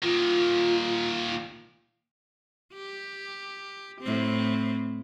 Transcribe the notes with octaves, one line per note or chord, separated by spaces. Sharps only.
A#2 D#3 F4
G4
A2 C4